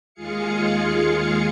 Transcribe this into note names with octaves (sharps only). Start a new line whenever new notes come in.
D#2 G#3 F4 G#4 F5 C#7